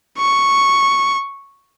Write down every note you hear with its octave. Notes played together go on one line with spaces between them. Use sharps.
C#6